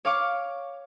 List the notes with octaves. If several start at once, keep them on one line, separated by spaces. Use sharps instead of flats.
C#5 F5 C#6 D6